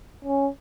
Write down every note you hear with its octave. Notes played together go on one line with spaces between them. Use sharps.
C#4